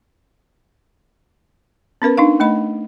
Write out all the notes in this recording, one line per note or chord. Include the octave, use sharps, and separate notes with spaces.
B3 C#4 A#4 B4
D4 D#4 F5
A3 D#5 B5